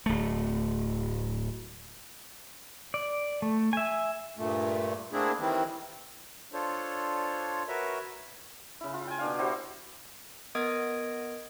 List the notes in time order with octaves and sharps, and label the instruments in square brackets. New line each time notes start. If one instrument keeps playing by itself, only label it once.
[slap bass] D1 A3
[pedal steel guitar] D5
A3
E5 G#5
[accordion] G2 A#2 A3
A3 A#3 C4 D4 E4 G#4
D#3 E3 G3 C4
[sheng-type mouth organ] D4 F4 A4 C5 C#5
F#4 A#4 B4 C#5 E5
[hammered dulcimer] C#3 E4
F4
G5 G#5
B2 D4 F5
E4 F#4 G4 C5
[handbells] B3 A#4 D#5 D#6 G#6 D7